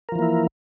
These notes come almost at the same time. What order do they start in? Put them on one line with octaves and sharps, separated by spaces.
A#4 F3 E3 A#3 E4